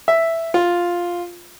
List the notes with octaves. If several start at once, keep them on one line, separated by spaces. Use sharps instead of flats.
E5
F4